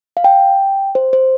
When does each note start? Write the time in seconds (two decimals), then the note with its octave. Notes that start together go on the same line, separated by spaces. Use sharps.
0.17 F5
0.24 G5
0.95 C5
1.13 C5